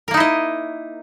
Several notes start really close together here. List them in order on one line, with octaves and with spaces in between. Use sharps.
A#4 A#3 D#4 E4 D#5